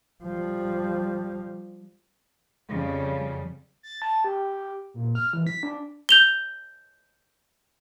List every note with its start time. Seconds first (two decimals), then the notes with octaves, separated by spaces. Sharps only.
0.24 F3 G3
2.69 F2 C#3 G3
3.83 A6
4.02 A5
4.25 G4
4.94 A#2
5.15 F6
5.33 E3
5.47 B6
5.63 D4
6.09 G6 F7 G7